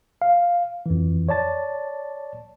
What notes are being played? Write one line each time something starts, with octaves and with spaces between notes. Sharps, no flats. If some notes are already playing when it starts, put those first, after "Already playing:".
F5
F2 E3
C#5 D5 A5 A6